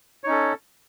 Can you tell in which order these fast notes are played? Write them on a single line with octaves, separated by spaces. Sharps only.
C#5 D#4 C#4 A4